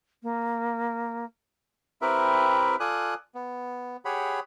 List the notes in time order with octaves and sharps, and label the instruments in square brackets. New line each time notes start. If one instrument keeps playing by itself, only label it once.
[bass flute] A#3
[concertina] C4 E4 G4 A#4 B4 E5
F4 A4 D5 G#5 D#6 F#6
B3
G4 G#4 C#5 F#5 B5